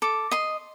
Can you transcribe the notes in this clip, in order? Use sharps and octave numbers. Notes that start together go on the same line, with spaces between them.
A4 D6
D#5 C6